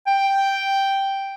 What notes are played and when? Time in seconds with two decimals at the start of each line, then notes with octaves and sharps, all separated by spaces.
0.07 G5